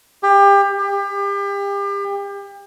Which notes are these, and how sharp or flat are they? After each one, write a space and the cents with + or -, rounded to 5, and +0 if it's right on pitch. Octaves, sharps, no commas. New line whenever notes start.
G4 +30
G4 +35